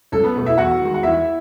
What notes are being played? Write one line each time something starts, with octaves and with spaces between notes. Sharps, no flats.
C#2 A4
B3 B4
B2 A3
E4 E5
E2 F#4 F#5
D#3 G#3
F#5
E2 E4 E5